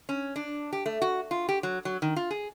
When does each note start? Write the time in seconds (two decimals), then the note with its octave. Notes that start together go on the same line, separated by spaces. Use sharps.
0.09 C#4
0.36 D4
0.73 G4
0.86 A3
1.02 F#4
1.31 F4
1.49 G4
1.63 F#3
1.85 F#3
2.02 D#3
2.16 F4
2.31 G#4